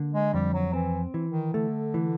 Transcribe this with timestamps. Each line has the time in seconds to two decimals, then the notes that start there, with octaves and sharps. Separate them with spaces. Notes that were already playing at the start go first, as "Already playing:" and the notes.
Already playing: D3 A#3
0.13 G#3
0.34 F2 G3
0.53 F#3
0.73 E3 C4
1.14 E3
1.27 D#3
1.54 D3 A3
1.94 E3